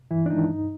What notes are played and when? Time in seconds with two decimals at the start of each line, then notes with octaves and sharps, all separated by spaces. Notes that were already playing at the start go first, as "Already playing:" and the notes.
0.11 G2 E3 E4
0.26 D4
0.30 D#3 G#3 D#4
0.49 G2